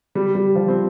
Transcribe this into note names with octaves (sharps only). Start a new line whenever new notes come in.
G3
G3
F3
C4